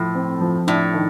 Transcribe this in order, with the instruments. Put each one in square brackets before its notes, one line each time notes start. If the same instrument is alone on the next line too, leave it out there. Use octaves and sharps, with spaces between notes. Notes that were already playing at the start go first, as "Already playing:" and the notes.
Already playing: [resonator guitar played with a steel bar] A2 [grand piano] F3 A3
[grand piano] C4
F3
[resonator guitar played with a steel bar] A2 [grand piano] D4
[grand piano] D#3